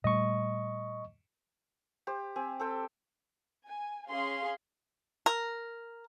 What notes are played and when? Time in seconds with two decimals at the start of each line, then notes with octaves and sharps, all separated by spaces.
0.04 A#2 G3 A3 D#5 C#6
2.07 G4 C5
2.36 C4 G4 G#5
2.59 C4 A4 G5
3.68 G#5
4.10 C#4 G#4 F5 C6
5.26 A#4